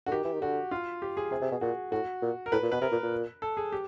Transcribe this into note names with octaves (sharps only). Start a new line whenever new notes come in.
D3 F#4
D#3 G4
E3
D#3
D3 F#4
F4
G4
G#4
C3 G#4
C3
B2
A#2 F#4
A2 F#4
A#2
A#4
A2 B4
A#2
B2 B4
C3 A#4
A#2
A#2
A4
G#4
G4